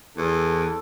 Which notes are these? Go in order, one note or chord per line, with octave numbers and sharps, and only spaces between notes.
E2 A4